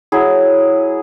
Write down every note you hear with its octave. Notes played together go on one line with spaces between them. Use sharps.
F#3 E4 G#4